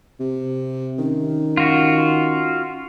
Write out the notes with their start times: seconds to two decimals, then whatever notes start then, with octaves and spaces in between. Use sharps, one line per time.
0.20 C3
0.99 D#3 C#4
1.57 F4 F#4